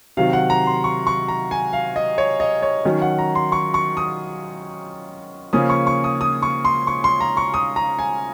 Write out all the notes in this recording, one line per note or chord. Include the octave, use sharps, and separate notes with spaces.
C3 D#3 F#3 F5
F#5
A#5
C6
C#6
C#6
A#5
G#5
F5
D#5
C#5
D#5
C#5
D#3 F#3 C#4
F#5
A#5
C6
C#6
C#6
D#6
C#3 F3 A#3 C#4 D#6
C#6
C#6
D#6
D#6
C#6
C6
C#6
C6
A#5
C#6
D#6
A#5
G#5